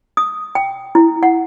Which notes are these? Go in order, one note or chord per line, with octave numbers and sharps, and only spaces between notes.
D#6
G5
E4
F#5